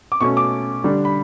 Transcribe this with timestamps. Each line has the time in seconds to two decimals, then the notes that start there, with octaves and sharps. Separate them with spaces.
0.12 D6
0.21 B2 A3 C#4 C#6
0.37 D6
0.84 D3 G3 D4
1.05 B5